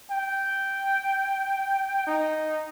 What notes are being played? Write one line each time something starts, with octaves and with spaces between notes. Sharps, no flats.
G5
D#4